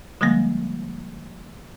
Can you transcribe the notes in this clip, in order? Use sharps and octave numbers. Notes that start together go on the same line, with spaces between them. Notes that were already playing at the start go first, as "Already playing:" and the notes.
D3 F3 G3 G#3 A#3